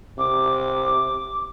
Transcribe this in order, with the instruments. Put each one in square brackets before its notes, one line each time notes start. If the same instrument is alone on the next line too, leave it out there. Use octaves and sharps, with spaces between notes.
[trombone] C3 [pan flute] D6